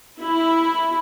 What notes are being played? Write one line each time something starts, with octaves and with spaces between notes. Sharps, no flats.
E4